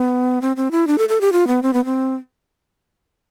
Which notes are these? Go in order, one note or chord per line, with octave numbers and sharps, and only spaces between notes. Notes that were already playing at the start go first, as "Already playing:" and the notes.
Already playing: B3
C4
C4
E4
D4
A4
A4
G4
F4
B3
C4
B3
C4